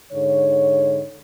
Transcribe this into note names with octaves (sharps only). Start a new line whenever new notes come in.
G#2 D3 C#5